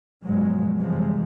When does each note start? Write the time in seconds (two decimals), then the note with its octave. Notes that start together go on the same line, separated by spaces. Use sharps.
0.25 G2 B2 F3 F#3 G#3
0.79 F#2 C3 E3 F3 G3 G#3